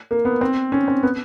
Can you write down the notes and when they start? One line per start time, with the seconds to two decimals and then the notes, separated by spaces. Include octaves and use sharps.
0.11 A#3
0.25 B3
0.41 C4
0.72 C#4
0.88 C4
1.03 B3